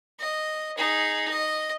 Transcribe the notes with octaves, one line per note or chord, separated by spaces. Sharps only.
D#5
D#4 G#4
D#5